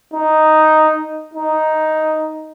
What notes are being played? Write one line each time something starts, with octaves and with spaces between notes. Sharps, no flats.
D#4
D#4